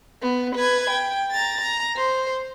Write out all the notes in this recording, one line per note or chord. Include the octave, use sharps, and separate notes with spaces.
B3
B4 G#6
G5
A#5 A6
A#5
C5